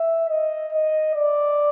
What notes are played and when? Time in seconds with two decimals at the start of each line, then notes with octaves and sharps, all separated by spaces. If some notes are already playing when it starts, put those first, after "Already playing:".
Already playing: E5
0.30 D#5
0.72 D#5
1.15 D5